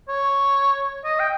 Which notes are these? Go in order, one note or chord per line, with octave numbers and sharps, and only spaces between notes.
C#5
D#5
G5